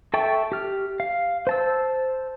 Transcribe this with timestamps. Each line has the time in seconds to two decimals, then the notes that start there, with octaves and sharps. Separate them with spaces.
0.14 A4 E5 G5 A5 C#6
0.52 G4 F6
1.00 F5
1.47 C5 A5 E6